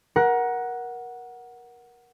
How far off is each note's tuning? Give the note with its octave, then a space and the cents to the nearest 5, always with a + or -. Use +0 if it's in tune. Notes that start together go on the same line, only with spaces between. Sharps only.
A#4 +25 F#5 +0